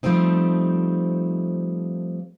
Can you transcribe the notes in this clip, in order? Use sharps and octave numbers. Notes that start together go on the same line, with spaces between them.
F3 G3 A3 C4 D#4